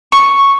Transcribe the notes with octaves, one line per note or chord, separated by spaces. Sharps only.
C#6